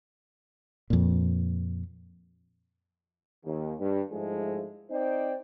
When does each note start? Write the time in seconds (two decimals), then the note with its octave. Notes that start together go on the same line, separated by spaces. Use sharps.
0.90 F2 A#2
3.45 D#2
3.80 G2
4.12 G#2 F3 G#3 A3 E4
4.91 C4 D#4 C5 D5 G5